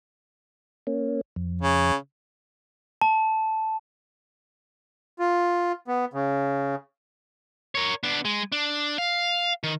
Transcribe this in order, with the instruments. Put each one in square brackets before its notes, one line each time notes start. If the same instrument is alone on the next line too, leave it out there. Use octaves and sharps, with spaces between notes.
[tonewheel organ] A#3 C#4
F2
[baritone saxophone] C#3
[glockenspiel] A5
[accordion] F4
B3
C#3
[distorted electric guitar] A#4 C#5
B3 D4
G#3
D4
F5
D#3